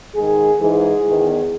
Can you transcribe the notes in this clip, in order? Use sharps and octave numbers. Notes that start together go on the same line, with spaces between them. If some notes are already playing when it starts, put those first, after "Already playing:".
G#2 D#3 G#4
G#2 E3 G#4
E2 D#3